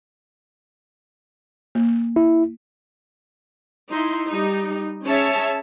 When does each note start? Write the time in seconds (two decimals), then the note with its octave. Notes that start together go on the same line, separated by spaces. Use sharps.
1.75 A#3
2.16 E4
3.90 D#4 E4 C6
4.29 G3 D#4
5.04 C#4 G#4 C#5 E5 A5